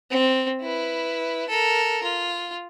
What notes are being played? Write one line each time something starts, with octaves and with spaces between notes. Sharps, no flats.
C4
E4 B4
A4 A#4
F4